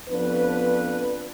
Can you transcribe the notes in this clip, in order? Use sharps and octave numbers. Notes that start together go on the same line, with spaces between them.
F2 F3 B3 D4 B4